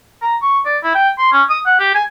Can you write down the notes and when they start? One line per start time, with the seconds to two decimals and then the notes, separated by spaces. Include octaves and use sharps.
0.22 A#5
0.42 C#6
0.66 D5
0.83 E4
0.95 G5
1.18 C6
1.32 C#4
1.50 D#6
1.66 F#5
1.80 G4
1.95 G#5